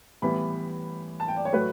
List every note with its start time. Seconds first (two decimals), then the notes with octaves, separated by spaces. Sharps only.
0.22 A2 E3 G3 B3 B5
1.20 A5
1.28 G5
1.36 D5
1.45 C#5
1.53 A2 F#3 A3 B4